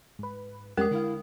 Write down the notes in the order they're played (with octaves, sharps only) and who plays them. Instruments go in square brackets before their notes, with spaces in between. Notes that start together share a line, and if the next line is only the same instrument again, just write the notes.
[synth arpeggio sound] G#2 B4
[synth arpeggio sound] F2 G3 C#4 [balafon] G#3 [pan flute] G4 [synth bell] A#4 D#6
[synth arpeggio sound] D3 F5 [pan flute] E4